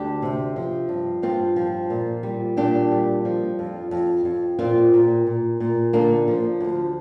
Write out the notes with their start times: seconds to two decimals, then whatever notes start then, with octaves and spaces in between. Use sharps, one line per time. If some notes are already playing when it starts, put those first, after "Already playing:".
Already playing: D2 D4 G4
0.22 C3
0.56 F3
0.89 G2
1.22 G2 C4 F4
1.56 F3
1.90 A#2
2.23 G3
2.57 A#2 D4 G4
2.91 G3
3.25 F3
3.59 F2
3.91 F2
4.25 F2
4.59 A#2 C4 F4
4.93 A#2
5.27 A#2
5.60 A#2
5.93 D3 A#3 D4
6.28 F3
6.61 D2